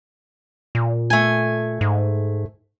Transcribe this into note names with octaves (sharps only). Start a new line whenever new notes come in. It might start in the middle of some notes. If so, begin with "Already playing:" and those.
A#2
A3 G#5
G#2